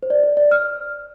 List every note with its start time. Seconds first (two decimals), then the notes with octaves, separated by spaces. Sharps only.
0.03 C5
0.10 D5
0.23 D5
0.37 D5
0.51 F6